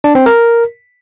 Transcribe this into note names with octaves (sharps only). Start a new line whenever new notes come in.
D4
C4
A#4